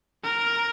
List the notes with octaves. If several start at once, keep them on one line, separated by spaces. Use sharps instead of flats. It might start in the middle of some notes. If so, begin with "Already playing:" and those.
A#4